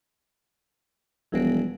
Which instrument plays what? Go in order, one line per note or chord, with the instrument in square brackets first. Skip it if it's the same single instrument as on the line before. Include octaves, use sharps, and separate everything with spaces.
[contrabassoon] E1 [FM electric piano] F3 G3 B3